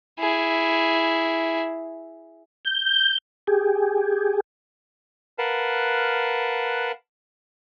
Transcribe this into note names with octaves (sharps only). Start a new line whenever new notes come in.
E4 G#4
G6
G4 G#4
A#4 B4 F5 F#5 A5